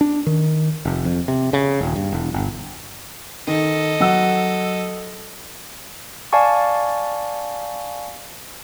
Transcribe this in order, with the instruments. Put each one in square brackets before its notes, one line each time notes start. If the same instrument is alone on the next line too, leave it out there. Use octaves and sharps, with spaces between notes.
[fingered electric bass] D4
D#3
F1
F2
C3
C#3
D#1
G2
E1
G1
[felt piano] D#3 [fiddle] A4 D#5
[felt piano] F#3 F#5 E6
[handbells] D5 F5 G#5 A5 C#6